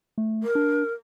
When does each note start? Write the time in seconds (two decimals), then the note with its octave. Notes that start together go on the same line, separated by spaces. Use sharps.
0.18 A3
0.43 A#4
0.55 D4